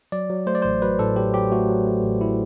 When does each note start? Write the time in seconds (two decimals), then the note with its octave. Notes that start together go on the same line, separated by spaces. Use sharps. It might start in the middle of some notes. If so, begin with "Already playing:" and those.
0.12 F#3 D5
0.30 F#3
0.47 A3 C5
0.55 D5
0.62 A1 C5
0.82 F#3 B4
0.99 A2 A4
1.16 F#3 G4
1.33 F#3 G4
1.51 A3 F#4
1.69 F#3
1.86 A3
2.04 A1
2.21 E4